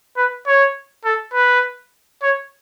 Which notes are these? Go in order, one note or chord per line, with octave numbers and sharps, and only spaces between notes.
B4
C#5
A4
B4
C#5